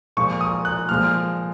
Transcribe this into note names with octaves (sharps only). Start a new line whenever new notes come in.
A#2 F3 G#3 C#6
D#6
F#6
A#2 F3 G#3 F6